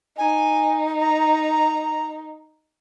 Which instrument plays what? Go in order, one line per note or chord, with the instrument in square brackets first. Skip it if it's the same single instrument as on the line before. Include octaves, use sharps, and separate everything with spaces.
[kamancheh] D#4 [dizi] G#5
[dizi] A#5